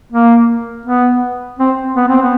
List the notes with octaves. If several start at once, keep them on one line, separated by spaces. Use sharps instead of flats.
A#3
B3
C4
B3
C4
B3